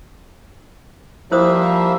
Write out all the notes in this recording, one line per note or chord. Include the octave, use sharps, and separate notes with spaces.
F3 G3 A#3 E4 C5 E5 D#6